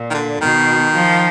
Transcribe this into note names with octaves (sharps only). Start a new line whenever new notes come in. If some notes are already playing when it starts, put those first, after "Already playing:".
Already playing: A#2
D#3
D3
B2 D#3
F3